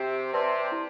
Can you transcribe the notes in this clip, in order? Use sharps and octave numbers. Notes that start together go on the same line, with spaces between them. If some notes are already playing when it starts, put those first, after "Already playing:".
Already playing: C3 C4 G4
C3 C4 B4 D5 A5 C6
E4